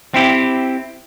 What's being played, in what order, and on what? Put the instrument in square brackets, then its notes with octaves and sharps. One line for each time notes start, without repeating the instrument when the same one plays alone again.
[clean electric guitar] C4 E4 G4